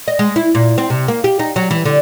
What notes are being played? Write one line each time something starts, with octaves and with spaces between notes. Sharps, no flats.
D#5
G#3
E4
A#2
C4
C3
A#3
G4
D#4
F#3
E3
D3